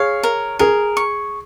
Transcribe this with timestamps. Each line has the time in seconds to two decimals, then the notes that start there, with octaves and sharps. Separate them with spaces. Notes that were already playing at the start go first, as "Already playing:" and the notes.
Already playing: G#4 C#5 F5
0.23 A#4
0.59 G#4 A#4
0.97 C#6